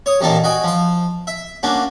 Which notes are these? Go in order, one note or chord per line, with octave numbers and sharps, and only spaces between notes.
C#5 D#6
A1 A#2 D#3 A#3 D#4 A5
F#4 D#5 G5 G#5
F3 C6
E5
A#3 C#4 D4 F#4